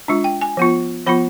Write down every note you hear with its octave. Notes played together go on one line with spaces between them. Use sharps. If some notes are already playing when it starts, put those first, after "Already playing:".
G#3 D4 F4
G5
G#5
F3 B3 F4
F3 B3 F4 B5